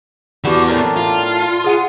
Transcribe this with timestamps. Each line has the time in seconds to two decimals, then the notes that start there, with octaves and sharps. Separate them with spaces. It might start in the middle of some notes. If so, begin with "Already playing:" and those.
0.44 E3 B3 D4 F#4 G4
0.68 A2 D4 A#4
0.97 F4
1.64 G#4 F#5 G#5